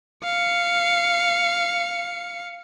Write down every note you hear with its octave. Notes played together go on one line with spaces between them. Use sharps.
F5 C#7